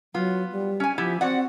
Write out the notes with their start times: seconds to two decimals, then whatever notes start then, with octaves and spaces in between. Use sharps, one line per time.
0.14 F#3 B3 F4
0.52 G3
0.80 C#4 G#5
0.98 F3 B3 E4 G4
1.21 C4 F#4 D5 F#5